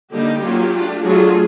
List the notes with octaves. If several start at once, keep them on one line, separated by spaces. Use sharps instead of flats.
D3 G3 A#3 D#4 G4
F#3 A#3 C#4 F4
A3 D4 F4
F#3 A3 D4 F4 G#4